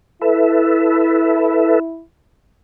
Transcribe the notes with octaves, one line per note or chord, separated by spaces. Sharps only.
E4 A4 B4 E5